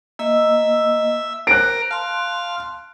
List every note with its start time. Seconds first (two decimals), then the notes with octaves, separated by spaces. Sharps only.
0.19 A#3 D#5 E5 E6
1.47 A#4 C5 F#6 D7
1.91 F5 A5 C6